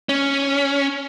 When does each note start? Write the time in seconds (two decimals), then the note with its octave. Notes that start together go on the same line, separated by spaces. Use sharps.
0.09 C#4